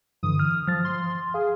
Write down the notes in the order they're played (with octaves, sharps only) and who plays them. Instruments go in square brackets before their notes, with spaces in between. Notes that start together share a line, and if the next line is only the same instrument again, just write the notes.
[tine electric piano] G2 D3 E3 [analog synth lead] D#6
[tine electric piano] F6
[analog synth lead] F3 [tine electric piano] F6 A6
[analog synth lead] C6
[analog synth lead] G#4 [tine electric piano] F5